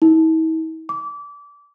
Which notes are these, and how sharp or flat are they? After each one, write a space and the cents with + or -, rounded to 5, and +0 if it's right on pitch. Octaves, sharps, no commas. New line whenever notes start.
E4 -45
D6 -25